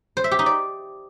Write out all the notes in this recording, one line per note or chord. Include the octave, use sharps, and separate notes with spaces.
C5
E5
G4
D#4
D5